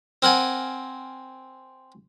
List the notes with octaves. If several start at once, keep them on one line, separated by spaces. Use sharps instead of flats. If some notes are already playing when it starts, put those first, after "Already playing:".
C4 A#4 F#5 G#5